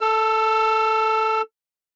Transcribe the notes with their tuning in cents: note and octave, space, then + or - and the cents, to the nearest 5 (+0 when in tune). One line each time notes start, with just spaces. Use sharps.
A4 +0 E6 +35